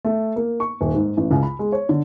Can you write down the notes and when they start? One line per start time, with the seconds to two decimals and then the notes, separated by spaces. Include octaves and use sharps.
0.05 A3
0.36 A#3
0.60 C#6
0.81 D#1
0.94 G#2
1.17 A1
1.31 C#2
1.43 B5
1.59 G#3
1.72 C#5
1.89 D3